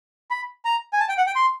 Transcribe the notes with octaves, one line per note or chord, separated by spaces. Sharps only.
B5
A#5
G#5
A5
G5
F#5
G5
C6